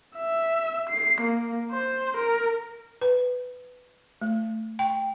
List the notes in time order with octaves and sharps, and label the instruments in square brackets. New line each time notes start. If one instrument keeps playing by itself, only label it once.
[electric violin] E5
C7
A#3
C5
A#4
[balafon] B4
A3
G5